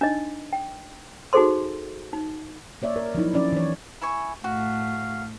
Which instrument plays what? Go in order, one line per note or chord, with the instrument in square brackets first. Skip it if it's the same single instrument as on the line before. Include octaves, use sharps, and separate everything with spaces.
[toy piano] D4 D#4 D#5
G5
D#4 F#4 G#4 A4 C5 C6
D#4
[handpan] A#3 C#5 D5 E5
A#4
F3 F#3 D#4 E4
F3 C#4 D4 D5
E3 C#5
[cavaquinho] E4 G#5 C#6
[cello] A2 A3 [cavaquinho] F#4 [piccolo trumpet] F5